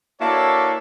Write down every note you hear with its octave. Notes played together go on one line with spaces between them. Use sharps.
A#3 D4 E4 F#4 A4 C#5